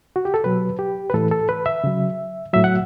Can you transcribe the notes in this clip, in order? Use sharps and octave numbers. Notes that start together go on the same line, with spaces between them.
F#4
G4
A4
B2 F#3 B4
G4
B4
A2 E3 A4
A4
B4
E5
C#3 F#3
A2 F#3 E5
F#5